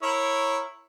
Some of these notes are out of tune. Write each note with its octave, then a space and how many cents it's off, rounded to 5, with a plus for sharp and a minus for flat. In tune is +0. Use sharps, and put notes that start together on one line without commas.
E4 +0 A#4 -15 C#5 -15